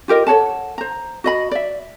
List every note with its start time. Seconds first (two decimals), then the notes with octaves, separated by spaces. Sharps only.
0.08 F4 G4 A#4 D#5
0.27 A4 C#5 F#5 A5
0.78 C5 A#5
1.24 F#4 D#5 B5
1.51 D5 E5